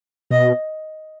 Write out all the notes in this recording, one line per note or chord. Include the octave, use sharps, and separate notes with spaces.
B2 D#5